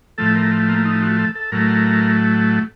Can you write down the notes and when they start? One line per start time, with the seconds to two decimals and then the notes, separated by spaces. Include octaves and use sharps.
0.18 A2 F3 A3 A4
0.35 A#4
0.69 A#3
0.85 D#4
1.02 F#4
1.19 A4
1.35 A4
1.52 A2 F#3 A3 A#4